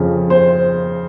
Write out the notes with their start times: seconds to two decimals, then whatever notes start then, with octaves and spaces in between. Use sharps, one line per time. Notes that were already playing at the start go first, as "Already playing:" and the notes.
Already playing: F2 C#3 F3
0.30 C5